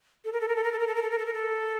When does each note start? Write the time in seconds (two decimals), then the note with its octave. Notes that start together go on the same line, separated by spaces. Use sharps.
0.25 A4
0.33 A#4
0.41 A4
0.48 A#4
0.56 A4
0.64 A#4
0.72 A4
0.79 A#4
0.87 A4
0.95 A#4
1.02 A4
1.11 A#4
1.18 A4
1.26 A#4
1.34 A4